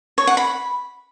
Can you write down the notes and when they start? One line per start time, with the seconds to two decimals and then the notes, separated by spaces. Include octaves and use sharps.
0.18 C#5
0.27 F#5
0.37 B5